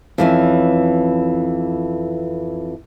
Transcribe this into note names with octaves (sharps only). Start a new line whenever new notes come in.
F2 E3 C#4